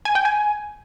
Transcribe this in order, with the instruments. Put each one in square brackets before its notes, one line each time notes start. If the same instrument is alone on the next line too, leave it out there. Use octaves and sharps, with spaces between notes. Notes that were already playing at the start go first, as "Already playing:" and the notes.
[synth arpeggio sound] G#5
G5
G#5